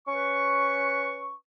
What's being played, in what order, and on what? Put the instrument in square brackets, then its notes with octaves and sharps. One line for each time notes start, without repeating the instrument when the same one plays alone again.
[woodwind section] C#4 B4 C#6